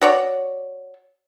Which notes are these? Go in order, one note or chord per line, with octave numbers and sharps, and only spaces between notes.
F#4 C#5 D5